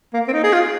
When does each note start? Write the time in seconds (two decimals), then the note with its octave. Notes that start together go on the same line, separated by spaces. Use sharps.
0.14 A#3
0.28 C4
0.33 D#4
0.43 G#4
0.53 F4